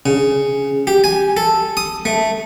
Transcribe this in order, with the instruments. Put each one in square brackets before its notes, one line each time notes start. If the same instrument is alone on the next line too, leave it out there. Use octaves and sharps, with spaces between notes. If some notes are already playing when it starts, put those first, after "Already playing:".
[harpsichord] C#3
G4
G#5
A4
D#6
A3